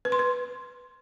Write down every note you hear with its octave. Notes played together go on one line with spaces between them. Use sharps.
B4
C6
B4